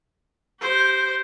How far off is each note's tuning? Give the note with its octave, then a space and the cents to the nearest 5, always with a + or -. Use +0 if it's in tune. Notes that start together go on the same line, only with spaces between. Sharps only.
G4 -25 C5 +0